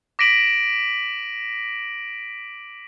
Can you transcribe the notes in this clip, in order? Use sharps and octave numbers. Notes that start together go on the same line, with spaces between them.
D6 A#6 B6 D7 D#7 F#7